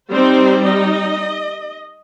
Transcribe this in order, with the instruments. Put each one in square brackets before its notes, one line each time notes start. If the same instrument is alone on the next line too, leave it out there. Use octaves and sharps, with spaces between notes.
[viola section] G3 C4 D#4 C5
D#4 D#5